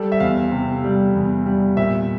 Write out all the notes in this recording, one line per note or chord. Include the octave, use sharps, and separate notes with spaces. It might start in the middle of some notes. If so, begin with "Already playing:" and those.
Already playing: G3 A4
E5
E2 F5
C3
G3
E2
G3
A#2 E5